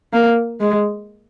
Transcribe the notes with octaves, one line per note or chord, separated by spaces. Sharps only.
A#3
G#3